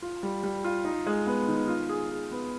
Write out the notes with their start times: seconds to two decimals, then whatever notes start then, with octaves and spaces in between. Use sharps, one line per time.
0.02 F4
0.23 G3
0.44 G3
0.64 F4
0.85 D#4
1.06 G#3
1.27 B3
1.48 D#3
1.68 F4
1.89 G#4
2.09 G#4
2.31 B3